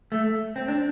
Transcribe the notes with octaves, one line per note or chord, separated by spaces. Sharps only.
A3
C4
D4